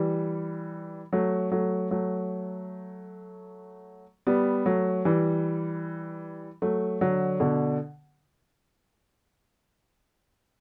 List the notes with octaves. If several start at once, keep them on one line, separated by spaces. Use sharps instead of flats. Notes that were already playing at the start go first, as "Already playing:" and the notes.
Already playing: E3 G3
F#3 A3
F#3 A3
F#3 A3
G3 B3
F#3 A3
E3 G3
F#3 A3
D3 F#3
B2 D3